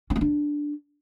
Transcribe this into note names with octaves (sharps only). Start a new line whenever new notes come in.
C#4
B3
D4